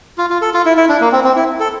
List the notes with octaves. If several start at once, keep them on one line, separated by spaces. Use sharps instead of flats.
F4
F4
A4
F4
E4
E4
D4
A#3
C4
C4
E4
A4